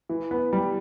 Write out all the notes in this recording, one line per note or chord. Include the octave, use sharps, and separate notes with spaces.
E3
B3
G3